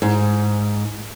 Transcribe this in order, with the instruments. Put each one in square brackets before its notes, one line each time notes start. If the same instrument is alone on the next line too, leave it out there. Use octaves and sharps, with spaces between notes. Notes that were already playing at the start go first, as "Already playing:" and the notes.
[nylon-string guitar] G#2